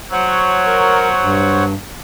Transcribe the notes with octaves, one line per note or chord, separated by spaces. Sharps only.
F#3 C5 C#5 F#5
A#4
G2